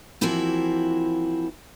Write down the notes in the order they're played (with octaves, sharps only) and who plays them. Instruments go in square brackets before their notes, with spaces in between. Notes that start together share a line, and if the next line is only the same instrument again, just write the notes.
[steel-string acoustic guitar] E3 F3 A#3 C4 E4 F#4